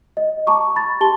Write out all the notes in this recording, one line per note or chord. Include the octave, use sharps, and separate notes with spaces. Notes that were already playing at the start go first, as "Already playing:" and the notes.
D#5
A5 A#5 C#6 D6
B5 A6
G4 A5 C6 G7